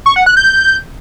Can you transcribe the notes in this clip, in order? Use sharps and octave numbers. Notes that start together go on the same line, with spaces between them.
C#6
F#5
F#6
G6